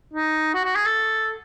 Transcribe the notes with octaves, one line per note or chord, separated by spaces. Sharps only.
D#4
F#4
F#4
G#4
A4